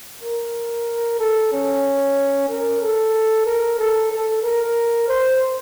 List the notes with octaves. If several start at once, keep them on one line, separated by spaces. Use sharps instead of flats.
A#4
A4
C#4
A#4
A4
A#4
A4
A4
A#4
C5